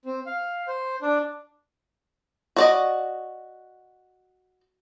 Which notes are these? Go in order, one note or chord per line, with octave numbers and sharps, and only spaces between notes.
C4
F5
C5
D4
F#4 D5 D#5